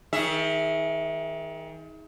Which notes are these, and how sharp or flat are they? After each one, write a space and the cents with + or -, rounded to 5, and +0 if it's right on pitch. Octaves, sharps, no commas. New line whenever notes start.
D#3 +30 G#4 +0 E5 +0